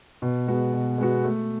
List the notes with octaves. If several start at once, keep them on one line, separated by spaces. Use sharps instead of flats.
B2
G#3 B3 F#4
B2
G#3 B3 F#4
A3